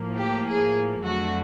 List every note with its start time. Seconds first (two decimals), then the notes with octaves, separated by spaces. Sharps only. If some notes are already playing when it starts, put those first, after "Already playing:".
Already playing: A2 F3 A#3
0.18 G4
0.47 G#4
1.03 F2 D3 F#3 A3 F#4